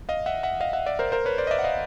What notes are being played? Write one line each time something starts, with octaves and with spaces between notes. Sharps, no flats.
D#5 F5
E5 F#5
E5 F#5
D#5 F5
E5 F#5
D5 E5
A#4 C5
A#4 C5
B4 C#5
C5 D5
D#5
D5 E5
F#5
D#5 F5